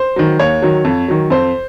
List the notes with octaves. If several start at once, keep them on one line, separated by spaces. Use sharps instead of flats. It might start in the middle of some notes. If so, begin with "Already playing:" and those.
Already playing: C5
D#3 F#3
D#2 C#5
D#3 F#3
F2
D#3 F#3
F2 C5